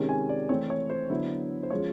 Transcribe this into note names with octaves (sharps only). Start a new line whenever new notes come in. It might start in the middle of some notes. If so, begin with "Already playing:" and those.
Already playing: C3 D#3 G#3 C#4
G#5
D5
E3 A3 C4 C#5
C#5
C5
D3 F#3 B3 E4
C5
F3 G#3 C#4 F4 C#5